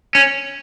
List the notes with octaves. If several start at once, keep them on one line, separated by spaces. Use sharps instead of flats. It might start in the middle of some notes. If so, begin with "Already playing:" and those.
C#4